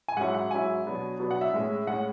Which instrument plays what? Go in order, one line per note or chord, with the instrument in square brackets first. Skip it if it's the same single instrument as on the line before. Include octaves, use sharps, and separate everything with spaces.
[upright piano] G#5
G#2 F#3 C#4 E4 F#5
F#5
G#2 F#3 C#4 E4 G#5
B2 F#3 B3 D4
B2 F#3 B3 D4
F#5
E5
A2 G#3 C#4
A2 G#3 C#4 F#5